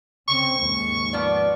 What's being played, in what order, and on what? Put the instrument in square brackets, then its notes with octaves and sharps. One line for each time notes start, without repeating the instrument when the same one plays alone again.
[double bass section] C#3 C4 [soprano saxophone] C#6
[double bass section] D#2 G#2
[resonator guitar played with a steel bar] F3 B3 D5